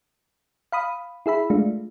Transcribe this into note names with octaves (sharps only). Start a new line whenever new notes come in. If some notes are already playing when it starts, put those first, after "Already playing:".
F5 B5 D#6
E4 G#4 E5 B5
G#3 A3 D4 F4